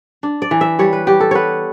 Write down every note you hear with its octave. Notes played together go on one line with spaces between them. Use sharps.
D4
D5
E3
E5
G3 C#5
B4
G3 G4
A4
B3 B4 C#5